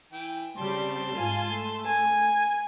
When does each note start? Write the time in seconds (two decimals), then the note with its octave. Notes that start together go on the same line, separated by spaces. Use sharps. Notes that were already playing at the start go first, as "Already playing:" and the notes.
0.13 E3 G5
0.58 C#3 G3 C4 A5 C6
1.16 G#2 F4 G#5
1.51 A3
1.86 G#5